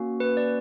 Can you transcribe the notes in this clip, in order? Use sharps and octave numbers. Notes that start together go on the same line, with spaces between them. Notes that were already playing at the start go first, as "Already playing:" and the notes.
Already playing: A#3 C#4 F#4
B4
D5